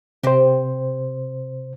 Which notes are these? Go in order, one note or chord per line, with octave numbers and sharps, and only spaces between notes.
C3 C4 G4 C5